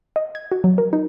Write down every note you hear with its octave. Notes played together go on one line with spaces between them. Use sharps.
D#5
G#6
F#4
F#3
A#4
D#4